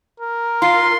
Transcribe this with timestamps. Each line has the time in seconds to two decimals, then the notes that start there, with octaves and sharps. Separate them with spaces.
0.20 A#4
0.62 F4 C6